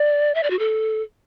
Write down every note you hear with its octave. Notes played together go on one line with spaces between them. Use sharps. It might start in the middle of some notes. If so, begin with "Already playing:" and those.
Already playing: D5
E5
D5
F#4
A4